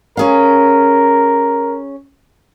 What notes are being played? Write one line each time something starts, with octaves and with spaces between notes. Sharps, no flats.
C#4 G#4 A#4 F5